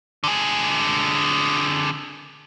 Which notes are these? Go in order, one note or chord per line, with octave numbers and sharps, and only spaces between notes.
D3 G#4